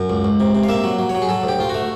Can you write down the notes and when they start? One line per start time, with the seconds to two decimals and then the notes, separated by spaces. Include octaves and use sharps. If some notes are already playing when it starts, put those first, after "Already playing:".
Already playing: F#2
0.10 C#2
0.24 C#2
0.40 C3
0.55 C3
0.64 F5
0.69 A#3 E5
0.84 F#3
0.99 F#3
1.09 C#5
1.15 F#3
1.22 G#4
1.29 F#3 A4
1.43 D2 G4
1.59 D2 F4
1.69 A3 F#4